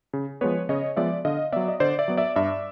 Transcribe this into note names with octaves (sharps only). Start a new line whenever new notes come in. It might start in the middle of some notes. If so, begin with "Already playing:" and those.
C#3
F3 G#3 B3 B4 C#5
C#3 C#5 D#5
F3 G#3 B3 D5 E5
D3 D#5 F5
F#3 B3 D5 E5
D#5
D3 C5 D5
D5 E5
F#3 B3
D5 E5
G2 D5 E5